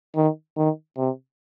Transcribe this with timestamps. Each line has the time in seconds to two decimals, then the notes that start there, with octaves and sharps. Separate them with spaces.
0.16 D#3
0.57 D#3
0.97 C3